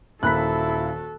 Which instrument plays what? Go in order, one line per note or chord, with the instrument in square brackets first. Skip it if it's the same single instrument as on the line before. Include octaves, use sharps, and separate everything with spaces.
[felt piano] D#1 A#3 B6 [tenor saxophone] E4 [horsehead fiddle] F#4 A4 [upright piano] B5 F#6